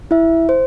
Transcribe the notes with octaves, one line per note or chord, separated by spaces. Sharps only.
E4 E5
C5